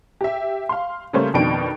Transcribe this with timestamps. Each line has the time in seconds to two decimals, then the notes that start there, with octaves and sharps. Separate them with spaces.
0.21 G4 E5
0.69 F5 C6
1.13 C#3 G3 A3 A#3 C5 C#5
1.34 F2 B2 D#3 D4 G5 D7